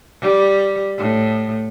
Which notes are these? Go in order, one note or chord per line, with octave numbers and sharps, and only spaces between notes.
G3
A2